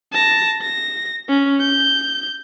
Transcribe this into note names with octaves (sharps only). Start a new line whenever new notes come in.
A5 A#6
A#6
C#4
G6